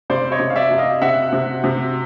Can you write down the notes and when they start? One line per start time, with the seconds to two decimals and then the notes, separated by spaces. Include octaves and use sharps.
0.10 C3 C5 D5
0.32 C#5 D#5
0.40 C3
0.50 F5
0.56 D5 E5
0.71 C3
0.78 D#5 F5
1.01 C3 E5 F#5
1.33 C3
1.64 C3